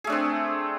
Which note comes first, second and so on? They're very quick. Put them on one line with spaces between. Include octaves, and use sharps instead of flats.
G#4 A3 D4 C4